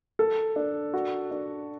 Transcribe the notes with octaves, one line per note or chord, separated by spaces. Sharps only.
A4
D4
F#4
D4